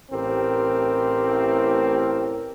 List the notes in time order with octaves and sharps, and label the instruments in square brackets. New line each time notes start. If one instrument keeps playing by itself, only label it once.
[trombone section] A1 A2 C4 G4 A#4